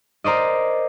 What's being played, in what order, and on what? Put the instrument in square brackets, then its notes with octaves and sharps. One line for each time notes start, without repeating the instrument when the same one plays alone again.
[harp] A#4 C5 D5 D#5